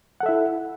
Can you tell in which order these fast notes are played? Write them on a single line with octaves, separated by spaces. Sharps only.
F#5 A4 E5 E4